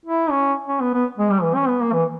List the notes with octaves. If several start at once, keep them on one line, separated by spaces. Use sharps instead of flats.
E4
C#4
C#4
B3
B3
G#3
G3
E3
C#4
B3
A#3
E3